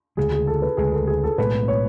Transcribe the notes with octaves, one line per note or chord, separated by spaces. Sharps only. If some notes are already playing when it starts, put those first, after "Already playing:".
D2 C#3 G#3 G#4
G#4
A4
B4
D2 C#3 G#3 G#4
A4
G#4
A4
B1 A2 G#3 B3 B4
C#5